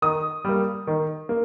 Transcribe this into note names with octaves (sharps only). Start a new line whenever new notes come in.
D#3 D#6
G3 A#3
D#3
A#3